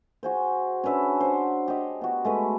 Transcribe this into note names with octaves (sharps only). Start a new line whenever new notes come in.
F#4 G#4 C5
C#4 D4 B4 E5
C5 F#5
G4 D#5
B3 F#4
G#3 A3 B4